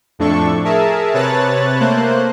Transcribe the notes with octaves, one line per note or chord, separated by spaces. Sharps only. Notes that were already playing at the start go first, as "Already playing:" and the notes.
F2 A2 D4 A4 C#6
G#4 A#4 E5 A5
C3 B4 C#5 A5 F#6 A6
A3 A#3 C5 F#6